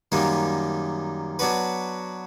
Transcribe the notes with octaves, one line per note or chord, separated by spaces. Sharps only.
F#2 D#3 G3 A#3 D#4
F#3 B3 D4 F#4 B4